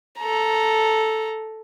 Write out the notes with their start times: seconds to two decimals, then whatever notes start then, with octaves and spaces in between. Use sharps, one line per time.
0.20 A4 A#5